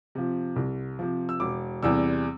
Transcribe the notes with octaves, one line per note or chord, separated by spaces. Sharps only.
C3 F3
C2
C3 F3
E6
E1 D6
E2 C3 G3 E6